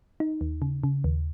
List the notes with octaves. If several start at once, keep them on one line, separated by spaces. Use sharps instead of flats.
D#4
D#2
C#3
C#3
D#2